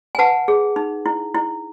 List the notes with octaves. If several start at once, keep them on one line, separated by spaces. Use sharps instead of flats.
G#5
B4 F#5 A5
G#4
D#4
E4
E4